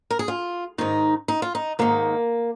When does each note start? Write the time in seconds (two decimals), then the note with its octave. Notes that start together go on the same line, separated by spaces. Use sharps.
0.11 A#4
0.19 G#4
0.28 F4
0.78 G#2 D#3 D#4
1.28 D#4
1.42 F4
1.55 D#4
1.79 G#2 D#3 A#3